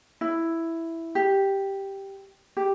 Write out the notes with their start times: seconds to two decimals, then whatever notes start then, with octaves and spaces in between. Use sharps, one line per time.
0.21 E4
1.15 G4
2.57 G4